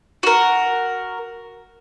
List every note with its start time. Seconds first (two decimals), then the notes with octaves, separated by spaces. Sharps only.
0.23 F#4 A#4